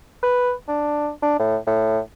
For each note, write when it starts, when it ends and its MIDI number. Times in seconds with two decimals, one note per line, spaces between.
0.22 0.53 71
0.68 1.09 62
1.22 1.35 62
1.39 1.57 45
1.67 1.99 45